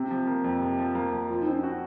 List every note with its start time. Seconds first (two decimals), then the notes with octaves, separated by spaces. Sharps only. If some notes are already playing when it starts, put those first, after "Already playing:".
Already playing: C3 C4
0.11 F3
0.27 A#3
0.44 F2
0.61 C3
0.78 F3
0.95 A#3
1.12 F2
1.29 F3 F4
1.42 C4 D#4
1.52 C#4
1.63 F#4